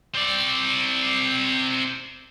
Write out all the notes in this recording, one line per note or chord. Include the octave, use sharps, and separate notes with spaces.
C4 D5